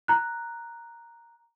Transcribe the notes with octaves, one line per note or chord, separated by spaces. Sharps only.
A#5 F#6